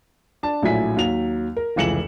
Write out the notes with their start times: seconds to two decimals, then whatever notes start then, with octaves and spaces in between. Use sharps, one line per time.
0.43 D4 A5
0.62 A#1 A2 F#3 E4 G#5 B6
0.97 D#2 F#3 F7
1.57 A#4
1.76 F1 C#2 E3 C#7 E7 F#7